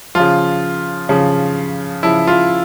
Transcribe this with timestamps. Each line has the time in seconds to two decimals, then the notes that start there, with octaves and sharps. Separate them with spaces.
0.15 C#3 F3 F4
1.09 C#3 F3
2.03 C#3 F3 E4
2.27 F4